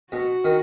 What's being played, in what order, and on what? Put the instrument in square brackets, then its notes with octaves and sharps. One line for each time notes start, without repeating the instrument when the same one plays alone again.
[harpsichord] B2 [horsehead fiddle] F#4
[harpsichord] D#3